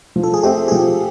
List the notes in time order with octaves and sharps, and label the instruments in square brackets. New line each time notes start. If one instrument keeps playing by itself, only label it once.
[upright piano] F3
[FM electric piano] A4
G#4
[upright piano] A3 C4 [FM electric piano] G4
[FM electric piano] G#4
[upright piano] F3 [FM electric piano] G4